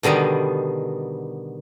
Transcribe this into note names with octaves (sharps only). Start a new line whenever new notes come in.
B2 D3 D#3 G3 B3